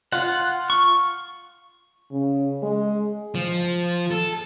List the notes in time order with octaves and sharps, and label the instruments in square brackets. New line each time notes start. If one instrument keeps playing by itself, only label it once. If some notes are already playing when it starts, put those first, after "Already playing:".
[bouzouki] F4 [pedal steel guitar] F#5
[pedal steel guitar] C#6
[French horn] C#3
G#3
[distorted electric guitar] F3
A4